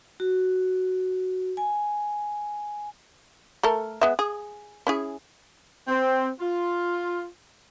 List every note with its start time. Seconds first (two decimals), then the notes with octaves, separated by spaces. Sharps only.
0.20 F#4
1.57 G#5
3.63 A3 A4 A#4
4.01 G#3 B3 E5
4.19 G#4
4.87 C#4 E4 G#4
5.88 C4
6.40 F4